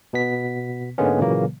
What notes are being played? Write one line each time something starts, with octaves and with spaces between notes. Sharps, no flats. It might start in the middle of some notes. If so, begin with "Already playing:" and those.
B2 B3 B6
G#2 D3 G#3 A#3 B3 C#4
A#2 C#3 E3 F#3 A#3